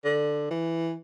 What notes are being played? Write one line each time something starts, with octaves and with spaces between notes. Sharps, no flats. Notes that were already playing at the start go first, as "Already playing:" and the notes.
D3
E3